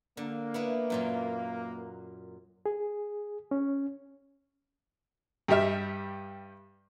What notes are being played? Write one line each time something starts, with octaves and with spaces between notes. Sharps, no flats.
D3 A#3
B3 E4 B4
F#2 A#2 F#3
G#4
C#4
G2 G3 G4 E5 F6